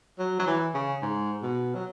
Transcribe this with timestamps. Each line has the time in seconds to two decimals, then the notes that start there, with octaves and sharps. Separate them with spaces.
0.19 F#3
0.39 F#3
0.47 E3
0.75 C#3
1.02 G#2
1.43 B2
1.75 F#3